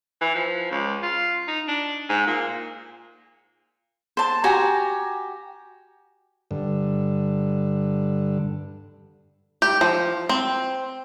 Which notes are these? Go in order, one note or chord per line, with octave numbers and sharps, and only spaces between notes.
E3
F3
C#2
F4
D#4
D4
G#2
A#2
C5 A5
F#4 G4 G#5 A#5
G2 D3
G4
F3
C4